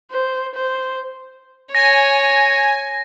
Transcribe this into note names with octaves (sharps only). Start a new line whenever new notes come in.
C5
C5
C#5 G#5 A#6